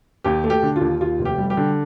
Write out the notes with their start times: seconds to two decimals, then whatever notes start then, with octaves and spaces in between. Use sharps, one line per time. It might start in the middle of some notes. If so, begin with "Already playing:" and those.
0.24 D#2 G4
0.44 A3
0.50 G4
0.63 D3
0.76 F4
0.81 D#2
1.00 D#2 F4
1.19 F1
1.25 G4
1.38 G3
1.50 G4
1.57 D3